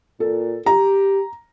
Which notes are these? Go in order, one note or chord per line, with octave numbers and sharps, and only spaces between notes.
A#2 A4
G4 A#5